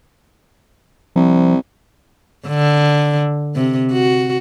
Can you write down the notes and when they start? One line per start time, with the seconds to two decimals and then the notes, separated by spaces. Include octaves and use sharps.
1.16 C2 F3
2.47 D3
3.55 C3
3.92 F#4